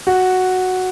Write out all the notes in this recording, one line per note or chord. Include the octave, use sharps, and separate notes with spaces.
F#4